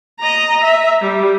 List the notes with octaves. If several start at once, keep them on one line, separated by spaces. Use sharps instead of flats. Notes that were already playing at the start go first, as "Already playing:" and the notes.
D#5 A#5
E5
G3